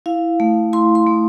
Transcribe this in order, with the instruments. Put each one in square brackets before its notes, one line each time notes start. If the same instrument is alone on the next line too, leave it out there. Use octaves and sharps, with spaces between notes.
[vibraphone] E4 F5
A3
E4 C6
C6
A3